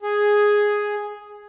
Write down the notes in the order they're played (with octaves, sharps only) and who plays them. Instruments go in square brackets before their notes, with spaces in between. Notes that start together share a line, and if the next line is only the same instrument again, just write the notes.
[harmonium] G#4